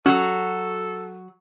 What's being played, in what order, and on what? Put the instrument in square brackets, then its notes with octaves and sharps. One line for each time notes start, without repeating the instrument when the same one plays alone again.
[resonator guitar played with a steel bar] F#3 F#4 [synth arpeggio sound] C#4 [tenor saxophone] A4